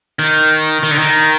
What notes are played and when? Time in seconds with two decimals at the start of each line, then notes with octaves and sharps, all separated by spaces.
0.19 D#3
0.83 D#3
0.91 D3
0.99 D#3